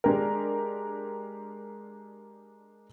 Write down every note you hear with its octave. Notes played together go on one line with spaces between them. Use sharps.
G#3 D4 G4 A#4